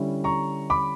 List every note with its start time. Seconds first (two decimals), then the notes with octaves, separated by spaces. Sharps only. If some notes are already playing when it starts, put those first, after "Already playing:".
Already playing: D3 G3 C#4 E4
0.24 A#5 C#6
0.70 B5 D6